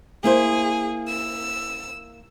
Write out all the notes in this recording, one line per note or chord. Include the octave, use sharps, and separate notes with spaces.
A#3 E4 G#4 C5
E6